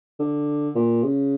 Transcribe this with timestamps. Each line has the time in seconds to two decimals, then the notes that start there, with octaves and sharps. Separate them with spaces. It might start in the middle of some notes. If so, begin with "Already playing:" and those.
0.20 D3
0.76 A#2
1.03 C#3